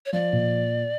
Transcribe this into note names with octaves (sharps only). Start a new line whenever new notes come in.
C#5
F3 D5
A#2